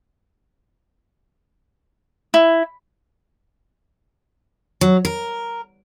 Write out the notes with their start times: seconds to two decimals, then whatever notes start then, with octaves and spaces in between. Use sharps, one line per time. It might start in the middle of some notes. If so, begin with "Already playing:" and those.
2.34 E4
4.81 F#3
5.05 A#4